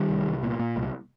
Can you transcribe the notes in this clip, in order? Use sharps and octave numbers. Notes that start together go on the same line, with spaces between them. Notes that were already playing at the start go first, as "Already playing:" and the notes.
Already playing: D#3 G3
C2
C2
A#2
A#2
C2